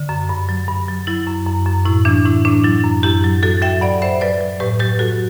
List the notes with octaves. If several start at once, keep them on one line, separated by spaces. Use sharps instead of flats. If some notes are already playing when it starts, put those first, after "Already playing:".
Already playing: D3
F#2
G2
F#3
G2
F#3
F#3 E4
F#2
F#2
F#2
A2 E4
E3 D4
A2 E4
A2 D4
F#3 E4
F#2
F#2 E4 G4
F#3
F#3 F#4 A4
F#3 E5 G5
G2 D5 F#5
G2 C5 E5
F#3 B4 D5
F#3
A2 G4 B4
F#3 G4 B4
F#3 F#4 A4